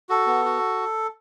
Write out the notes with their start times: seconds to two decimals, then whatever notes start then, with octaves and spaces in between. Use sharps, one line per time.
0.09 F#4 A4
0.27 B3
0.45 F#4